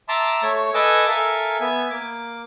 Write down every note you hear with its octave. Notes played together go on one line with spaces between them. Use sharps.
E5 A5 A#5 C6 D6 E6
A3 C#5 C#6
A4 B4 D#5 G#5 D6 E6
A4 A#4 E5 F5 G#5
B3 E5 G#5
A#3 D6